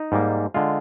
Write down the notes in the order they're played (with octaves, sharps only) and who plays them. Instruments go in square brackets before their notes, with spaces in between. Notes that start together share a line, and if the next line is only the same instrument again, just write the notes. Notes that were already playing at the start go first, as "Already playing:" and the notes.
Already playing: [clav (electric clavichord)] D#4
G#2 G3 A#3
D3 G#3 F4